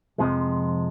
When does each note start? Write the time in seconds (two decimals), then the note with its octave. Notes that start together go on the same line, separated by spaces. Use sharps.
0.18 F2 C3 F3 G#3